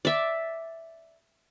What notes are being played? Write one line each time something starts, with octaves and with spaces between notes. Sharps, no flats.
D5 E5